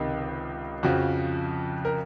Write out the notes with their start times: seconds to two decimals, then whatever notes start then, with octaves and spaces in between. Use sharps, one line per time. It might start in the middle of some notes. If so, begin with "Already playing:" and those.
Already playing: C#2 C3 D#3 D#4
0.83 F2 C#3 F3 F#4
1.85 A#4